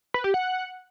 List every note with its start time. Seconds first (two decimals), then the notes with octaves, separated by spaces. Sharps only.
0.14 B4
0.24 G4
0.34 F#5